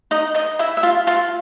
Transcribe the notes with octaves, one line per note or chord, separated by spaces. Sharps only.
D#4 D#5
D#4 D#5
E4 E5
E5
F4 F5
F4 F5